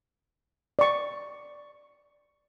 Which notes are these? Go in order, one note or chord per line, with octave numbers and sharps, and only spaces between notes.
D5 C#6